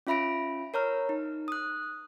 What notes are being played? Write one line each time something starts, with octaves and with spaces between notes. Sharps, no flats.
C#4 F4 E5 B5 A#6 D7
A#4 C#5 A#5 F6
D#4
D#6 F#6